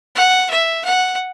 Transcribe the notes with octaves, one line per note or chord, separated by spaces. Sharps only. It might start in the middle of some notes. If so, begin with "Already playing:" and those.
F#5
E5
F#5